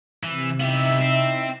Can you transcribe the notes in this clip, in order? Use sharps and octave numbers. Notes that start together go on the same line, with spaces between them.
C3 E3
B3 D#4 E4 G4 E5
C4